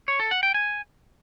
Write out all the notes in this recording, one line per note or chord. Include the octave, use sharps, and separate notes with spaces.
C#5
A4
F#5
G5
G#5